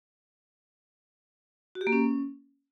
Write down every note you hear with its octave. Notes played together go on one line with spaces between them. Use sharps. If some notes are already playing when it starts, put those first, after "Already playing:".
F#4
G4
A#3
C#4